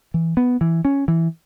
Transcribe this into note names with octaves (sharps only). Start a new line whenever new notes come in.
E3
B3
E3
C#4
E3